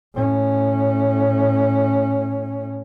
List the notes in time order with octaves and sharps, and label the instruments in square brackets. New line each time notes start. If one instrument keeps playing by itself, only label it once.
[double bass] A2 C#4